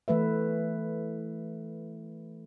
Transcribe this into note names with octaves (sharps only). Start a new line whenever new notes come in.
E3 A3 B4 E5